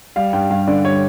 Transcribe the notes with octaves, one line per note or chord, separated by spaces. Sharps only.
G3 F5
G2 G5
G2 F5
D3 D5
G3 C#5